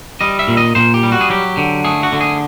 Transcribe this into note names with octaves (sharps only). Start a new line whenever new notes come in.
G3 D#5
E5
A#2
D#5
A#2 C5
G4
G3
F#4
G#4
F#3 G4
D3
A3 G#4
F#4
D3
G#4